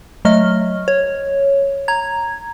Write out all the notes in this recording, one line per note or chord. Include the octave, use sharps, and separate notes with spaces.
F#3 A3 D#5 F6
C#5
A#5 G#6